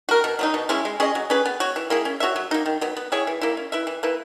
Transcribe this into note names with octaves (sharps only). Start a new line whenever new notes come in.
F#4 A#4
B2
F#3 B3 D#4
B2
G#3 C#4 E4
G#3
C#4 G#4 D#5
F#3
C#4 G#4 B4
B3
F#4 C#5
E3
A#3 E4 G#4
C#4
F#4 C#5 E5
F#3
A#3 D#4
D#3
F#3 B3
B3
E4 G#4 C#5
E3
A#3 E4
C#4
E4 B4 E5
E3
A#3 E4 B4